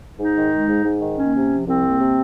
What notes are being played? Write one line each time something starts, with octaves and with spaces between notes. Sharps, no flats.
G#2 D#4
D#3
G#3
G#2
G#2
D#3
A#3 C#4
C3
F3
C2 C4
A#3
C3